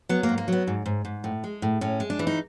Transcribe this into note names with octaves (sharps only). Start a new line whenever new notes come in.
F#3 B3
A#3
G#2
A#3
F#3 B3
G#2
G#2
G#2
A2
G#3
A2
A2 C#4
G#3
D4
E3
D#4